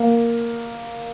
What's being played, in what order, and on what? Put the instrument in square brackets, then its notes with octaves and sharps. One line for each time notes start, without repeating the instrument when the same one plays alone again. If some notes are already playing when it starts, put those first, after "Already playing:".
Already playing: [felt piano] A#3